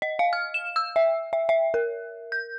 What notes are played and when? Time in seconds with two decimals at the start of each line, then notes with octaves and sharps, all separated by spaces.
0.02 D#5
0.19 F5
0.33 F6
0.54 E7
0.76 E6
0.96 E5
1.33 E5
1.49 E5
1.74 A#4
2.32 G6